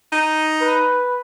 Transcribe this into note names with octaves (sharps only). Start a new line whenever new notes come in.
D#4
B4